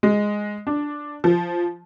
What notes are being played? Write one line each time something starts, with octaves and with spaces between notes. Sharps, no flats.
G#3
D4
F3